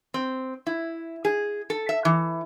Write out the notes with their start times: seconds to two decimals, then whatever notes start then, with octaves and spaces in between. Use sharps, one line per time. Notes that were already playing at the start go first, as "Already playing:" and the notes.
0.14 C4
0.67 E4
1.25 G#4
1.70 A4
1.89 E5
2.05 E3